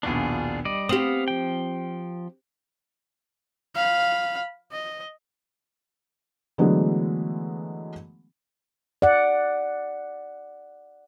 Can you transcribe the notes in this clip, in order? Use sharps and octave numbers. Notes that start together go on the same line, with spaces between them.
A#1 D#2 B2 D4 F4 G#4
G3 D5 D#5
B3 C4 G4 F5 D#6 F#7
F3 G5
F5 B5
D#5
D3 E3 F#3 G#3 A3 B3
D5 F#5